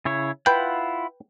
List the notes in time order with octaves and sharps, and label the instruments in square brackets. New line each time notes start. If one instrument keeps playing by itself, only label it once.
[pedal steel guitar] C#3 E4 C#5
[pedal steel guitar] E4 F4 F#5 [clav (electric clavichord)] B4 G5